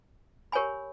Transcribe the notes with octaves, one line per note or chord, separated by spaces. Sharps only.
G4 A#4 C#5 G#5 B5